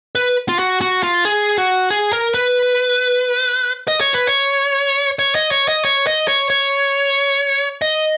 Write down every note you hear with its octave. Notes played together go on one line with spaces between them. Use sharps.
B4
F4
F#4
F#4
F4
G#4
F#4
G#4
A#4
B4
D#5
C#5
B4
C#5
C#5
D#5
C#5
D#5
C#5
D#5
C#5
C#5
D#5